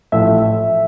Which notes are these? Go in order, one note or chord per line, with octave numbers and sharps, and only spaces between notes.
A1 A2 F3 A3 E5